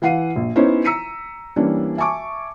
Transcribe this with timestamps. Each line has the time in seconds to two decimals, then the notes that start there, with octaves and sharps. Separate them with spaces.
0.02 E3 F5 F#5 C7 D#7
0.36 A#1
0.56 B3 C#4 D#4 E4 C5 C#5
0.84 A#5 E6 B6 C#7 D#7
1.56 E3 G3 A#3 C#4 D4
1.97 E5 G#5 A5 C#6 D6